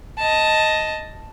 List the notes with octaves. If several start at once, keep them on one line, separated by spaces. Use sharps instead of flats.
D#5 A5